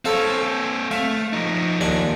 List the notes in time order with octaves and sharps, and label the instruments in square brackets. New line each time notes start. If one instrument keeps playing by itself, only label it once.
[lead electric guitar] C4 C#5 [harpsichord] A4 C5 F5
[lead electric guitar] A3 [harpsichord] F5
[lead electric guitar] F3 D#4
[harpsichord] D#2 D4 G#5